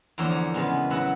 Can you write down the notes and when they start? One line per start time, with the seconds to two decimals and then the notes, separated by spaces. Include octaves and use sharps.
0.18 E2 D3 F3 A#3 C#5 A#5
0.54 C#3 G#3 B3
0.91 F#3 E4 D#5 F#5